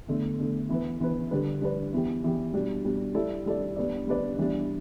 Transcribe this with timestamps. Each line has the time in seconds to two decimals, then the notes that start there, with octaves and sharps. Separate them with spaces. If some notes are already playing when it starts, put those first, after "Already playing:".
0.08 E2 D3 A3
0.38 E2 D3 A3
0.69 E3 B3 E4 B4
1.00 E3 B3 E4 B4
1.31 D3 G3 D4 B4
1.62 D3 G3 D4 B4
1.93 E2 E3 B3 G4
2.22 E2 E3 B3 G4
2.53 B2 G3 D4
2.84 B2 G3 D4
3.15 G3 E4 A4 D5
3.46 G3 E4 A4 D5
3.76 G3 B3 D4 B4 D5
4.07 G3 B3 D4 B4 D5
4.38 E3 G3 B3 D4